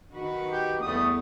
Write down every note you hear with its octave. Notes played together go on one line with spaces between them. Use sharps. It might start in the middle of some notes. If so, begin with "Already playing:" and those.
D#3 F#4 B4
G4
E2 G3 A3 B3 D#6